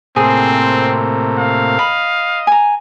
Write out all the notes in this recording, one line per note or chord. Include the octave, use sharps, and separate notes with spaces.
A2 C3 A#3 C4 G#4
F5
D#5 B5
G#5 A#5